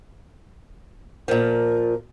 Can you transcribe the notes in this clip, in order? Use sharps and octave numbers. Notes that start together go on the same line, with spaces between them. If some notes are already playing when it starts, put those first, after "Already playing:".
A#2 F3 A#4